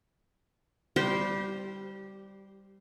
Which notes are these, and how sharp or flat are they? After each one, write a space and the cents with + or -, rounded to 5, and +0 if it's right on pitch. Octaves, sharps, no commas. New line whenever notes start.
G3 +0 G4 -25 C5 +0